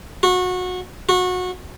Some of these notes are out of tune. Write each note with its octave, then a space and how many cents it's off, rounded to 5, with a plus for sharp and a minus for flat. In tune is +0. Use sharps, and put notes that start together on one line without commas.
F#4 -25
F#4 -25